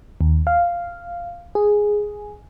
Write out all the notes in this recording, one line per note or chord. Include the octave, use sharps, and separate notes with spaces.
D#2
F5
G#4